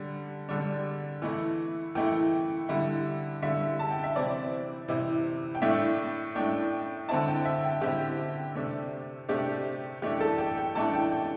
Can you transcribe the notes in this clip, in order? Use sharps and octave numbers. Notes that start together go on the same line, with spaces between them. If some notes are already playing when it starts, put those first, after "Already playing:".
Already playing: D3 G3 D4
D3 G3 D4
E3 A3 E4
E3 A3 E4 G5
D3 G3 E4
D3 G3 E4 E5
A5
G5
E5
C3 E3 C4 E4 D5
C3 E3 C4 E4
G5
A2 A3 D4 E5
A2 A3 D4 G5
D3 C4 E4 A5
G5
E5
G5
D3 C4 E4 G4
C3 A3 D4
C3 A3 D4 G4
E3 A3 D4 G4
A4
G5
G5
E3 A3 D4 A5
G5
G5